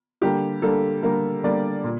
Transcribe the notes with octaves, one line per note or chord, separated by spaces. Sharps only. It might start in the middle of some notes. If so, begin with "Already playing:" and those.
D3 G3 A#3 G4
D3 G3 A#3 A4
D3 G3 A#3 A#4
D3 G3 A#3 D5
A#2